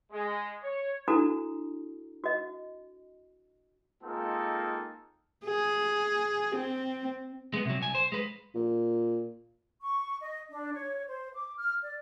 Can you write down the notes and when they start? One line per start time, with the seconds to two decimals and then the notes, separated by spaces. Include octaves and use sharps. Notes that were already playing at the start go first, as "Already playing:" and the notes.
0.13 G#3
0.63 C#5
1.08 D4 E4 F#4 A4 A#5
2.24 F#4 D#5
4.04 G#3 A#3 C4 D#4 F4 A4
5.45 G#4
6.56 C4
7.54 G#3 B3
7.65 C3 F#3
7.81 C2 G#5
7.95 C5
8.12 G#3 B4
8.55 A#2
9.82 C#6
10.21 D#5
10.51 D4
10.73 C#5
11.08 C5
11.34 D6
11.57 F6
11.82 D5